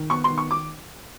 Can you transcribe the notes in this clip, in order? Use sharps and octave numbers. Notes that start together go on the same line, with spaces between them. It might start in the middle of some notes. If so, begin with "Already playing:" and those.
Already playing: D#3
B3 C#6
C6
D#3
C#6
D6